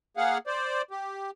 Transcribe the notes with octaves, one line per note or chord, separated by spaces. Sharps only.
A#3 G#4 F5 F#5
C5 D5
G4